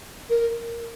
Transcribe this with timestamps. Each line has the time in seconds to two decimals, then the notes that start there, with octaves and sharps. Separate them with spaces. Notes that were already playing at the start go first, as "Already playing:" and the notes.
0.30 A#4